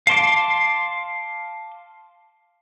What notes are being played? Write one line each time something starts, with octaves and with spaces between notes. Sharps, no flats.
F5 A5 C6 D6